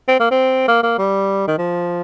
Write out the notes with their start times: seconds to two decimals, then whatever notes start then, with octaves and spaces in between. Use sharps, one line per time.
0.08 C4
0.20 A#3
0.31 C4
0.68 A#3
0.83 A#3
0.98 G3
1.48 D#3
1.58 F3